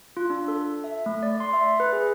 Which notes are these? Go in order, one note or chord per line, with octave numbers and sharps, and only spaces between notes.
F4
D4
A4
E5
A3
D5
C6
E5
B4
G#4